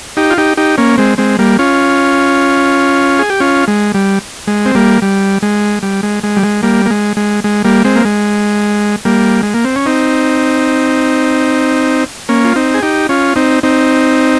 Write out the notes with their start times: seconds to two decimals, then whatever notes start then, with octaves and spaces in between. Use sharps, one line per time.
0.17 D#4 G4
0.30 F4
0.38 D#4 G4
0.57 D#4 G4
0.78 A#3 C#4
0.98 G#3 C4
1.18 G#3 C4
1.39 G3 A#3
1.59 C#4 F4
3.19 G#4
3.30 G4
3.40 C#4 F4
3.68 G#3
3.94 G3
4.47 G#3
4.65 C4
4.75 G3 A#3
5.02 G3
5.42 G#3
5.83 G3
6.03 G#3
6.23 G#3
6.37 G3
6.43 G#3
6.63 G3 A#3
6.86 A#3
6.90 G#3
7.17 G#3
7.44 G#3
7.64 G3 A#3
7.84 G#3 C4
7.95 A#3
8.05 G#3
9.05 G3 A#3
9.43 G#3
9.54 A#3
9.64 C4
9.76 C#4
9.86 C4 D#4
12.29 A#3 C#4
12.45 F4
12.56 C4 D#4
12.74 G#4
12.82 D#4 G4
13.09 C#4 F4
13.36 C4 D#4
13.63 C4 D#4